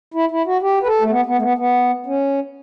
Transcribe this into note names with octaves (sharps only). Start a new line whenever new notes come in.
E4
E4
F#4
G4
B4
A4
A3
B3
B3
A3
B3
B3
C#4